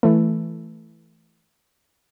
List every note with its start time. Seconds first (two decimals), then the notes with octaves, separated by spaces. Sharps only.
0.03 E3 A3